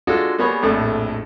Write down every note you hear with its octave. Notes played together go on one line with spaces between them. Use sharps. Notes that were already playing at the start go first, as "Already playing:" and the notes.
G#3 D4 F4 F#4 A4
G3 A#3 B3 G#4 C#5
A#1 F2 A2 A3